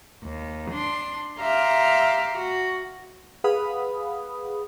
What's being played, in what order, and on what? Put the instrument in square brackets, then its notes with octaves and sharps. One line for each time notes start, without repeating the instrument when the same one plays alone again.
[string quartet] D#2
D4 C6
G4 E5 F5 A#5 C6
F#4
[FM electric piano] G#4 B4 F5 F#5 B5 D#6